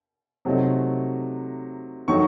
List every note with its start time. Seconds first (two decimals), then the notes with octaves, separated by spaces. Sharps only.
0.45 C3 F#3 A3 D#4
2.08 D#3 F#3 A3 D#4 C#6